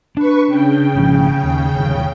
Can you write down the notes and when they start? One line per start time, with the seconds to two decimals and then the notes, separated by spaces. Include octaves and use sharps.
0.17 D4 B4 C#6
0.48 C#3 G5
0.95 G#1 F3
1.43 D#2
1.75 G1 D#2